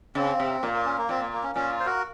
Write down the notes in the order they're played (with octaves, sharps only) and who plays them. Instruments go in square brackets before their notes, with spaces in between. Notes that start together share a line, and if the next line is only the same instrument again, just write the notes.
[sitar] C#3 [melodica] C4
[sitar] C3
[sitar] A#2 [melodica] A#3
[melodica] A#3
C#4
A#3
[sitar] A#2 [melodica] C4
[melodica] A#3
A#3
C#4
[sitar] A#2 [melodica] C#4
[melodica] F4
C5
F#4 A#4